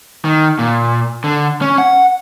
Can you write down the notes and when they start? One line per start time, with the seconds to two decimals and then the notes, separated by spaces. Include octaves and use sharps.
0.25 D#3
0.59 A#2
1.24 D3
1.62 C#4
1.78 F#5